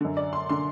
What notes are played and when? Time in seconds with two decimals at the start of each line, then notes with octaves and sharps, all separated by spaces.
0.01 F#2 D3
0.17 D5
0.33 C6
0.49 D3 C6